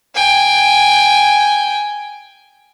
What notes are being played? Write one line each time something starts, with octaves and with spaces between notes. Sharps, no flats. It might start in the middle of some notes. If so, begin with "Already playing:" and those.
G5 G#5